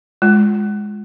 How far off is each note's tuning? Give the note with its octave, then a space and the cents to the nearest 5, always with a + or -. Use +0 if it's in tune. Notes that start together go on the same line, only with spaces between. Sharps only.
G#3 +0 F4 +0